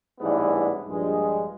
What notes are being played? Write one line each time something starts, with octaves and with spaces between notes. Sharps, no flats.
A1 G#2 E3 G3 B3 D4
A#1 G2 G#3